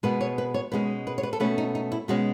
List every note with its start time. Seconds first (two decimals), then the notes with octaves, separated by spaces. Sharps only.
0.03 B2 G#3 B3 B4
0.21 C#5
0.38 B4
0.54 C#5
0.72 B2 G#3 C#4 B4
1.07 B4
1.18 C#5
1.23 B4
1.33 A4
1.40 B2 A3 C#4 B4
1.58 D#4
1.75 D#4
1.92 E4
2.08 B2 G#3 C#4 F#4